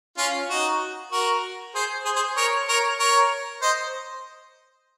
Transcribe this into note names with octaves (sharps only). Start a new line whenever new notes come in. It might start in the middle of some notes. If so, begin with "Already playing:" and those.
C#4 F4
D#4 F#4
F#4 A#4
G#4 C5
G#4 C5
G#4 C5
A#4 C#5
A#4 C#5
A#4 C#5
C5 D#5